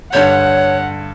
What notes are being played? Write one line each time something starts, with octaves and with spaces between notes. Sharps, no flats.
G2 D3 C#5 F#5 G6